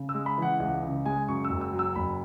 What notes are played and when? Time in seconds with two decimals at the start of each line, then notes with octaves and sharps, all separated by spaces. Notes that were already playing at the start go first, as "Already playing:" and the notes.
Already playing: C#3
0.09 E6
0.14 G#3
0.26 B5
0.38 E3 F#5
0.60 C#2 F#5
0.83 C#3
1.05 G#3 G#5
1.28 F#2 C#6
1.44 E6
1.50 F#1
1.61 E6
1.73 F#3
1.79 E6
1.96 F#1 B5